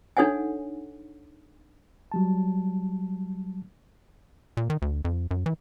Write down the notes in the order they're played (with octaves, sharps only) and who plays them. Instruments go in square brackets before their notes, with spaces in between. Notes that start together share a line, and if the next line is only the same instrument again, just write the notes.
[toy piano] D4 D#4 A4 C#5 F#5 G#5
[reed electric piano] F#3 G3 A5
[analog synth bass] A#2
D#3
D2
F2
F#2
E3